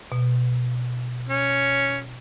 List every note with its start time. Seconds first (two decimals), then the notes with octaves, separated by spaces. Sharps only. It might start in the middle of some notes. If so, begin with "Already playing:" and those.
0.12 B2
1.29 C#4